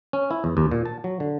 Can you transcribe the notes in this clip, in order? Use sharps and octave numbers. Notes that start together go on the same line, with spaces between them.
C#4
E4
E2
D#2
A#2
A5
F#3
D3